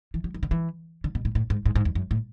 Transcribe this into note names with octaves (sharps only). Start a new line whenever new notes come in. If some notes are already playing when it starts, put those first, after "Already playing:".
E3
F#3
E3
D3
E3
D3
B2
A2
A2
G#2
G#2
G#2
E2
F#2
A2